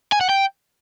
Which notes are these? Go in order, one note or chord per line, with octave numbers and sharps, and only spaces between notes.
G#5
F#5
G5